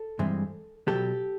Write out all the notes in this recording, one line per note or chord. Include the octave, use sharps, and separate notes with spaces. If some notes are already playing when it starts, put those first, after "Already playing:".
Already playing: A4
G2 E3 G#3 C4
B2 F#3 B3 G4 A4